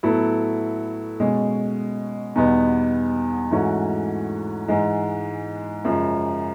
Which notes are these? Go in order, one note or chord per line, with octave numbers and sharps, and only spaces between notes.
A2 F#3 B3 E4 A4
B2 G#3 C#4
E2 B2 G3 B3 D#4
G#2 E3 A3 C#4 F#4
G#2 E3 G#3
F#2 C#3 F3 G#3